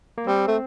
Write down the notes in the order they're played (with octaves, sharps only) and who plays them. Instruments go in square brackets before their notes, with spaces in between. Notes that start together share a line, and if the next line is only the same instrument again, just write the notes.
[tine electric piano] A#3
[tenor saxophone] G3 [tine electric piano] C4
[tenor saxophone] A3